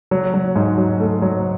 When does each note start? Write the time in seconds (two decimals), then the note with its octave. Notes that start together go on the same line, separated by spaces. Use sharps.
0.11 F#3
0.34 F#3
0.56 G#2
0.78 F#3
1.00 A3
1.22 F#3